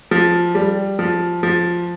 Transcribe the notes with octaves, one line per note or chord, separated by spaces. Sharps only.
F3
G3
F3
F3